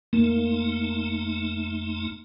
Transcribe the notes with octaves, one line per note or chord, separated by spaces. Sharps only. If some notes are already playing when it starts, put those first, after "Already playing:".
F2 A3 A#3 D#4